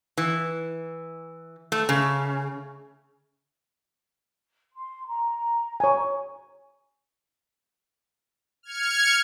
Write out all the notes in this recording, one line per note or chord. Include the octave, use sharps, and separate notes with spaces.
E3
A3
C#3
C6
A#5
C#5 G#5
F6 G#6 C#7